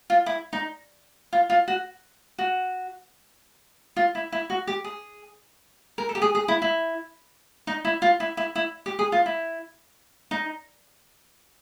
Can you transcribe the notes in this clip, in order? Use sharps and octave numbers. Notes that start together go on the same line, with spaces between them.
F4
E4
D#4
F4
F4
F#4
F#4
F4
E4
E4
F#4
G4
G#4
A#4
A4
G4
G#4
G#4
E4
E4
D#4
E4
F4
E4
E4
E4
G4
G#4
F4
E4
D#4